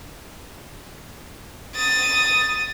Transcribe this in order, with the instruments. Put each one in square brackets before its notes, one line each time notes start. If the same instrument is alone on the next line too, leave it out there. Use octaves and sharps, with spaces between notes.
[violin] D#6 A6